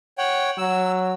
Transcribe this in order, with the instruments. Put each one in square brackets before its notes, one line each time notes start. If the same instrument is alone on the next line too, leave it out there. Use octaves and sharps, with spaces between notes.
[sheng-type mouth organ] C#5 F#5 G5
[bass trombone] F#3 [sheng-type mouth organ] E6